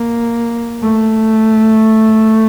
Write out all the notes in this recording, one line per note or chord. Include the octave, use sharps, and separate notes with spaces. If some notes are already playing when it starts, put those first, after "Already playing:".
Already playing: A#3
A3